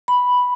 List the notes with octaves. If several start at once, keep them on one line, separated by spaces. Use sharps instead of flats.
B5